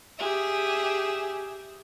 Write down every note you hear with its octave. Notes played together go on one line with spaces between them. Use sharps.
G4 G#4 E5